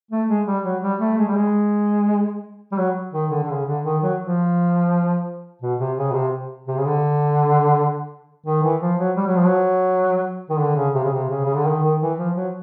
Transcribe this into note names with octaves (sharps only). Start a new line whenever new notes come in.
A3
G#3
G3
F#3
G3
A3
G#3
G3
G#3
G3
F#3
D#3
D3
D3
C#3
D3
D#3
F#3
F3
B2
C3
C#3
B2
C3
C3
C#3
D3
D#3
E3
F3
F#3
G3
F#3
F3
F#3
D#3
D3
C#3
C3
C#3
C3
C#3
C#3
D3
D#3
D#3
E3
F3
F#3